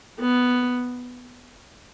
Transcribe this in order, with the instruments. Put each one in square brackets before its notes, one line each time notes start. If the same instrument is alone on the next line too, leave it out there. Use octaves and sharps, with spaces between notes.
[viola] B3